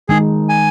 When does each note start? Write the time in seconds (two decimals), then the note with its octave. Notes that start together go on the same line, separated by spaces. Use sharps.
0.09 D#3 G#3 D#4 G#4
0.49 G#5